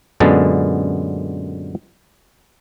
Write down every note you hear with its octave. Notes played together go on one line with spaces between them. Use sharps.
F#2 A#2 D3 G#3 B3 A5